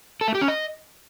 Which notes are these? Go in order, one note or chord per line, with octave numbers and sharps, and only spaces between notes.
A4
A3
G4
C#4
D#5